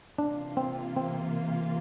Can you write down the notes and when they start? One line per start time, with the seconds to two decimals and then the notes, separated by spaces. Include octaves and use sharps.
0.18 C3 E3 A#3 D4 F4
0.57 C4
0.96 C4